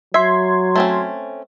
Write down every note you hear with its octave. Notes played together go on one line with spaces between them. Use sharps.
F#3 E5 C6 G#6
A3 C4 C#4